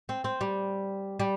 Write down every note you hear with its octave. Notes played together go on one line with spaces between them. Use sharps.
C4
C4
G3
G3